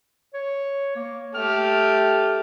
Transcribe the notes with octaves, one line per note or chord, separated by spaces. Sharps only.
C#5
A#3
A3 G4 F6